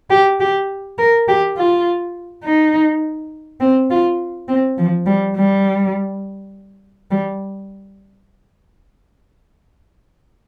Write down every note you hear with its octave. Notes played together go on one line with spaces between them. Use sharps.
G4
G4
A#4
G4
F4
D#4
C4
F4
C4
F3
G3
G3
G3